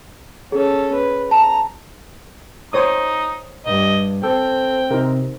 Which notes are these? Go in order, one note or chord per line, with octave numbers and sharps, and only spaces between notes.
C#4 G#4 A4
B4
A5 A#5
D#4 C5 C#5 D#6
G2 D#5
C4 A4 G5
C3 D#4 A#4